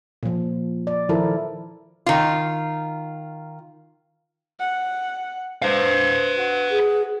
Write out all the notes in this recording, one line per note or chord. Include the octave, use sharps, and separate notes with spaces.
A#2 F3
D5
D#3 F3 E4 A4 A#4
D#3 F4
F#5
B4 C5 F5
F#4
G#4